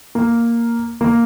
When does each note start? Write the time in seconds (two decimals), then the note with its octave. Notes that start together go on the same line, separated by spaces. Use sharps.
0.15 A#3
1.01 A#3